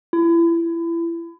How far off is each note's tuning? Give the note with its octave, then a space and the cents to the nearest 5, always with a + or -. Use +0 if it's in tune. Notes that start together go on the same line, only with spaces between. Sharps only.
E4 +30